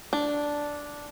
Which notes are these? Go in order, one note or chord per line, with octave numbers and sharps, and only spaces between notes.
D4